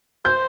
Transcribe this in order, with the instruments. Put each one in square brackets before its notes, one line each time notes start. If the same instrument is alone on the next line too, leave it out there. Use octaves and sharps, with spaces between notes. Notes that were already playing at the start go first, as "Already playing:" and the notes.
[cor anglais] C5 [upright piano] G6